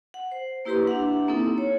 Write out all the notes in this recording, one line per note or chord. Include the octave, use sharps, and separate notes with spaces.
F#5
C5
A#3 E4 G4 B4 A#5 C6
D4 E5 F#5
A#3 C4 D#4 E4 A4
C#5